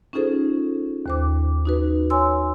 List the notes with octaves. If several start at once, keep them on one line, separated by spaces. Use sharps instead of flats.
C#4 D#4 F4 G#4 A4 C5
D#2 C5 D6
D#4 F#4 B4
C#5 G#5 C6 E6